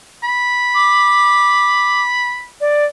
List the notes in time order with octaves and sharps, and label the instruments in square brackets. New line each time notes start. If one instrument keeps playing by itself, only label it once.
[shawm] B5
[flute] D6
D5